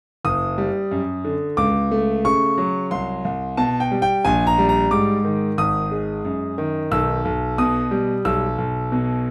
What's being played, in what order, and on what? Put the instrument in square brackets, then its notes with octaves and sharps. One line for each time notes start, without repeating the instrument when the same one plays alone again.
[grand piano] F#1 D#6
G3
F#2
D3
C#2 D6
A3
C#3 C#6
F#3
C2 C6
C2
B2 A5
G5
G3
G5
A#1 G#5
A#5
G3
A#5
G#2 D6
D#3
G#1 D#6
G#3
F#2
D#3
B1 E6
B1
B2 D#6
G3
B1 E6
B1
B2